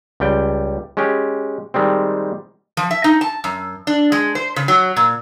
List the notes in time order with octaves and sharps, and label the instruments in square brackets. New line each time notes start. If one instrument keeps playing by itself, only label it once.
[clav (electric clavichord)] C#2 G3 G5
G#3 C#4 G4
D#3 G3 G#3 C4
[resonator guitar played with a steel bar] F3
E5
D#4
A5
F#2
D4
G#3
C5
C#3
F#3
A#2